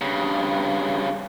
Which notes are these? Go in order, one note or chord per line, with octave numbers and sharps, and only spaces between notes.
G2 C#3